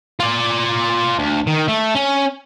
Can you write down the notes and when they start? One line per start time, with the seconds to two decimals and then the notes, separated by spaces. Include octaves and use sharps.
0.20 F4 D5
1.19 D2
1.47 D#3
1.68 A3
1.95 C#4